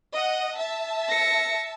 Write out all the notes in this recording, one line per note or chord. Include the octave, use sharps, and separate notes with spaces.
D#5 F#5
E5 A5
A#6 C#7